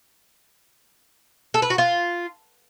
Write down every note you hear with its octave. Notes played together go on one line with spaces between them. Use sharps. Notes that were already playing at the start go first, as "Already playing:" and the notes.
A4
B4
F#4
F4